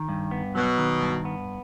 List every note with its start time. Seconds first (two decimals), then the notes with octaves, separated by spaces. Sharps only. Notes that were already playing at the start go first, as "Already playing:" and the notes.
Already playing: D#3
0.09 G2
0.31 B3
0.55 B2 F#3
0.78 D#3
1.02 G2
1.25 B3